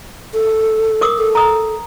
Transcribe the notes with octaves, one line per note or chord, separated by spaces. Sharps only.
A4
A#4 D6 D#6
A4
A#5 D#6